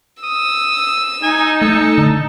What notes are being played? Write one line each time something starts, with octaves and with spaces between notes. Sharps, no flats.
D#6 E6
D#4 G#5
A3 A4
D3